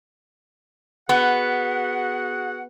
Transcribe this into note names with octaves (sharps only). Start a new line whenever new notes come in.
B3 F#4 G#4 F#5